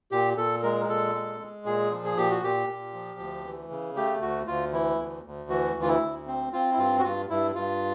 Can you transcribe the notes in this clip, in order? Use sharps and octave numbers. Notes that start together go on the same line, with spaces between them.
A#2 G4
A#2 A4
G#3 A#4
A#2 A4
G#3
G#3
A#2 G#4
F3
G#4
A#2 G4
F#4
A#2 G4
A#2
F3
D2
E3
C#3
A3 G4
D2 F#4
D2 F4
E3 E4
D2
D2
E3 F#4
D2
F4
E4
D2
C4
C4 F4
E4
G2 F4
F#4
G2 F4
G2 E4
G2 F4